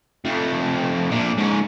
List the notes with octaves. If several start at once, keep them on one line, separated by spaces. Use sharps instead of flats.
F2 A3
A#2 D4
G#2 C#4